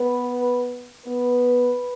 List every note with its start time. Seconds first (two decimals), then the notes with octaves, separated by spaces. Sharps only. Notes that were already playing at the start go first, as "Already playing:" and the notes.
Already playing: B3 B4
1.05 B3 B4